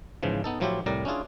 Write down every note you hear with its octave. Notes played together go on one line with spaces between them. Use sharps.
G#2 C#3 E3 F3
B3 D#4 A4
A2 F3 F#3 E4 F4 G4
C2 A2 G3 A#4 D5 A#5
C#4 D4 E4 F4 G#4